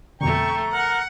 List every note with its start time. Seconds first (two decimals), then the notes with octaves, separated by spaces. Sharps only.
0.21 F2 B2 D3 A3 G5 A#5 C#6
0.72 A#4 F#5